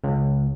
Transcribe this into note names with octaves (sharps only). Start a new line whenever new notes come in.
C#2